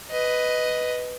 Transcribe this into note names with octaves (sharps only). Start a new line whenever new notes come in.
B4 D#5